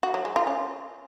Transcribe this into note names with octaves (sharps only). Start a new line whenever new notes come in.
F#4
F#3
G#3
F4
C#4